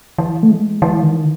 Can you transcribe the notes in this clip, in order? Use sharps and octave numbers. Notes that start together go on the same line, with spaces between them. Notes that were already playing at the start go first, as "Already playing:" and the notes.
E3
A3
G#3
E3
D#3